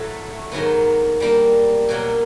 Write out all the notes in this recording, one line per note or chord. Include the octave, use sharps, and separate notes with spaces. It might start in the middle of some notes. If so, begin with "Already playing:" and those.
Already playing: A2 F#3 A3
G#2 D#3 F#3 B3
G3 A#3 D4
B2 F#3 A#3